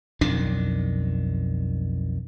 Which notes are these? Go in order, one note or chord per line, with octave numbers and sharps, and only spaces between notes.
B1 F2 D#3 D4